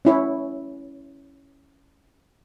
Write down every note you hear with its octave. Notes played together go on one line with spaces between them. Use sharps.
C#4 E4 C#5